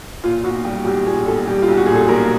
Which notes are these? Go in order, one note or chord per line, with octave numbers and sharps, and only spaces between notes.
A#2 F4
B1 F#4
G3 G4
B1 G4
A#2 G#4
B1 A4
G3 G4
F4
B1
F#4
A#2 G#4
A4
B1 A#4